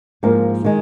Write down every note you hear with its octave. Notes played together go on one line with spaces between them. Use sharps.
G#2 F3 A#3 A#4
D#3 G#3